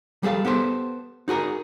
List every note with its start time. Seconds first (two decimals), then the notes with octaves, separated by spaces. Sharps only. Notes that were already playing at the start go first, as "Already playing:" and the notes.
0.23 G3 G#4 A4 F5
0.45 B3 G4 A4 C5
1.28 D#4 F#4 G#4 A#4